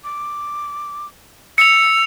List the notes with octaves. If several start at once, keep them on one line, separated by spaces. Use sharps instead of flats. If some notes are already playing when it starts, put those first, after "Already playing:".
D6
E6 C#7 F7